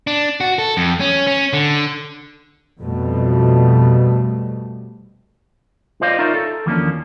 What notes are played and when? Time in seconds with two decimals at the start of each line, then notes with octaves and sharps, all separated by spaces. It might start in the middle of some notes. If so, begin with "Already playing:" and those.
0.07 D4
0.41 F#4
0.59 A4
0.77 F2
1.00 C#4
1.27 C#4
1.53 D3
2.81 F2 B2 G3 A3
6.01 F4 C5 D5 D#5 F5
6.19 D#4 F4 A#4 C#5 D5 E5
6.34 A4
6.66 D#2 E3 F3 A#3 C#4 D4